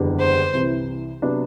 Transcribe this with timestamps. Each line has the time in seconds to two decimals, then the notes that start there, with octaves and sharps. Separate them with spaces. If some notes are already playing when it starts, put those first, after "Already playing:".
Already playing: F#1 E2 D3 G3 D4
0.19 C5
0.53 C2 C3 E3
1.22 C3 F#3 B3 D4